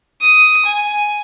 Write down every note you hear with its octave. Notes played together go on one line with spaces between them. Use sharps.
D#6
G#5